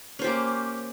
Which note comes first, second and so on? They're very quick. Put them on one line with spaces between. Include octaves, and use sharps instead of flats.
C#4 C5 G4 A#3